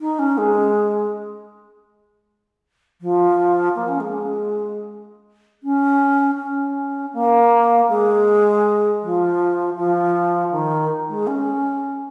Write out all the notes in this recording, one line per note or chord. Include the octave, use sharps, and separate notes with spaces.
D#4
C#4
G#3
F3
A#3
C#4
G#3
C#4
C#4
A#3
G#3
F3
F3
D#3
G#3
C#4